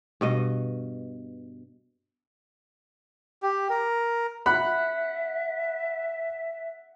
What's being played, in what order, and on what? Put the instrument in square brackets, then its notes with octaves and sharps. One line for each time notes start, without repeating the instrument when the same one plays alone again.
[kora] G2 B2 D#5
[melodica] G4
A#4
[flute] E5 [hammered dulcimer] F#5 [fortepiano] B5